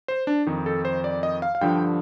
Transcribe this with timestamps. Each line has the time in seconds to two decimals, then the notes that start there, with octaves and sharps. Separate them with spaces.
0.08 C5
0.27 D4
0.47 F2 D#3 D#4
0.66 A4
0.85 C5
1.04 D5
1.23 D#5
1.42 F5
1.55 F5
1.61 G2 D3 F3 G5